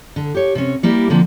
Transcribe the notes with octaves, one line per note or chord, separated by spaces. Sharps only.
D3
G4 C#5
C3 C#4
G3 A#3 E4 G4
D3 F3 A#3 C4